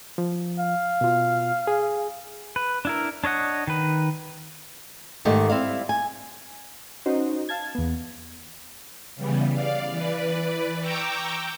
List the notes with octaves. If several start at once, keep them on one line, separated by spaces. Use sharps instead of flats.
F3
F5
B2 F4
G#4
B4
D4 E4 A#4
D4 C#5 D#5 F#5
D#3 B4
G#2 D#3 A3 G4
G3 C4 E4 F5
G#5
C#4 D#4 F#4 C5 D#5
F5 A5 G#6
E2 B3
C#3 E3 G3 B3
D5 F5
E3 B4 D5
G5 A#5 C#6 D6 E6 G6